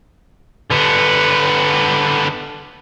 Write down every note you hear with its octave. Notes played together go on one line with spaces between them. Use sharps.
D3 B3